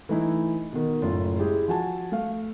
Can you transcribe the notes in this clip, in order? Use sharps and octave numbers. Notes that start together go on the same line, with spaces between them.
E3 A3 D#4 E4
B2 D#3
F#1 A2 F4
G#3 E4 G4 G#4
F3 F#4 G#5 A5
A3 F5